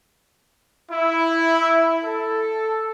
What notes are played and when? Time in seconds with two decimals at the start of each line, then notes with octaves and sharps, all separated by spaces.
0.91 E4
2.04 A4